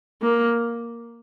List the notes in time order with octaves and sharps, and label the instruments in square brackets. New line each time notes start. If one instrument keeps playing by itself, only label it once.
[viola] A#3